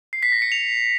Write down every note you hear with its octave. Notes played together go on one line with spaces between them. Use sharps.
C7
B6
A#6
C#7
F7